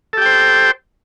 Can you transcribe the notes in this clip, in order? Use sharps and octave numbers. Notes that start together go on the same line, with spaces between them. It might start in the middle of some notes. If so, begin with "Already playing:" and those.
G4 A4 C5 G5